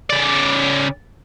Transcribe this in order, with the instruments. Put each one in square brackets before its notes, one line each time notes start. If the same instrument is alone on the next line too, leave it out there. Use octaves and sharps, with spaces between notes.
[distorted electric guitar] C#3 D5